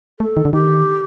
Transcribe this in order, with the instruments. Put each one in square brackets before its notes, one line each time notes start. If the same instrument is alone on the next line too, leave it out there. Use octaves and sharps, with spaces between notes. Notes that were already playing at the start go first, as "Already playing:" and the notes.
[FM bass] A3 [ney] A4
[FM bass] D#3
D3
[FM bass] D#3 [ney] G4